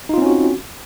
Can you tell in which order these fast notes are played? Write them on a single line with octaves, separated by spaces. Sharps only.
D#4 F4 C4 C#4 F#4